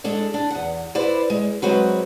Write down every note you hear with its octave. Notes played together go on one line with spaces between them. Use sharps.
G#3 D4 A4 D5
D4
E2 F#5
E4 B4 C5 D5
G#3
F#3 G#3 C4 F#4 B4